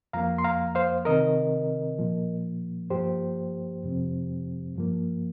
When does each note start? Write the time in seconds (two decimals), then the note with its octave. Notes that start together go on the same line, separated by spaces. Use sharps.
0.13 F2 F3 A#3 F5 A#5
0.38 C6
0.44 F5 A#5
0.75 C5 F5
1.05 C3 D#3 C4 A#4 D#5
1.98 A#2 F3 A#3
2.90 G2 F3 A#3 G4 C5
3.83 F2 C3 F3 C4
4.76 G2 F3 A#3